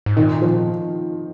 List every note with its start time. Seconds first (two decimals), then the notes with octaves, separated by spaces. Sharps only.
0.06 G#2
0.17 A#2 D#3
0.42 F3